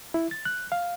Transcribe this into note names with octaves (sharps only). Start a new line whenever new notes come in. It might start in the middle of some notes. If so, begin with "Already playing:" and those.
E4
A6
F#6
F5